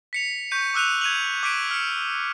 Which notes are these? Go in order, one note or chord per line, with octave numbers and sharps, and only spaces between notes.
B6 C#7 F7
C#6 G6 B6 D#7
D6 E6 F#6 D#7 F7
G#6 D#7 F7 F#7
D6 F#6 B6 D7 D#7
F6 C#7